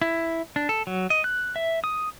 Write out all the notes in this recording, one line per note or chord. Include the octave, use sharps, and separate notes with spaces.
E4
D4
A4
F#3
D#5
F#6
E5
D#6